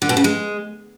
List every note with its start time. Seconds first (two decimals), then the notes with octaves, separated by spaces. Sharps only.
0.02 D3
0.09 B2
0.17 C#3
0.24 G#3